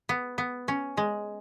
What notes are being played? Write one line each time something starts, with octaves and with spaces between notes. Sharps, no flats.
B3
B3
C#4
G#3